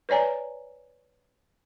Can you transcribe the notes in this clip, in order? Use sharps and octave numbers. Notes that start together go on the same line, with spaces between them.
B4 C#5 D5 G#5 A#5